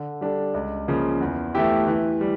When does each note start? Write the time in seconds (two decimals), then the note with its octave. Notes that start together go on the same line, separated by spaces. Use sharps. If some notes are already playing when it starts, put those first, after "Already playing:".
Already playing: D3
0.21 G3 D4 A4
0.54 C#2
0.88 C#3 F3 A#3
1.20 E2
1.55 E3 A3 E4 G4
1.87 E3
2.21 G3